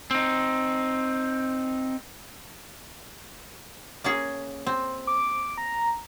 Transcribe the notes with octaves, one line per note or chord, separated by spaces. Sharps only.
C4 D#4
A#3 C#4 G#4
C4
D6
A#5